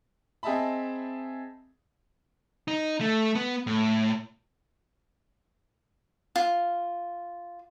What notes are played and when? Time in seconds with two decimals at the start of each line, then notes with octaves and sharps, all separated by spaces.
0.43 C4 G#4 D#5 E5 A5 B5
2.68 D#4
3.01 A3
3.35 B3
3.67 A2
6.36 F4